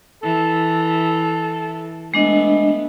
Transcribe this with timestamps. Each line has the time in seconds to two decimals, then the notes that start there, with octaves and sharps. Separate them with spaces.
0.23 E3 A4
2.14 G#3 A3 B3 D4 D#5